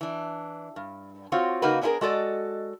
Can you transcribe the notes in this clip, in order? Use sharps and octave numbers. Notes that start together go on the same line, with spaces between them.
E3 D4
G2
C4 F4 F#4 C#5
C#3 A#3 D#4 F#4 B4
B3 C#4 D4 E4 G#4 A#4
G#3 F#4 A4 D5 D#5